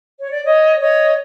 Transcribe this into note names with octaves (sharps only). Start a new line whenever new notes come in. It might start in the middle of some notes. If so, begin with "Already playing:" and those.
C#5
D5
C#5 D#5
C#5 D#5